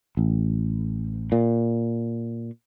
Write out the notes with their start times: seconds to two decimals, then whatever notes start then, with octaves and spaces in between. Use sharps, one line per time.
0.17 A1
1.32 A#2